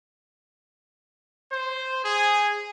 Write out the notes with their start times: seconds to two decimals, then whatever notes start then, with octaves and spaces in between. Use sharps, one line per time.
1.51 C5
2.04 G#4